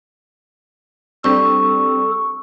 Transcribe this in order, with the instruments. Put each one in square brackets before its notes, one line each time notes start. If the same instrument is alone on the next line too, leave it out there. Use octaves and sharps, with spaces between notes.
[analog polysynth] G3 C4 D4 [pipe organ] A4 [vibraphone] C#6